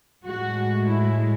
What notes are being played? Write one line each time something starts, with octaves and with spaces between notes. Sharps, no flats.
A2 G#3 F#4
E4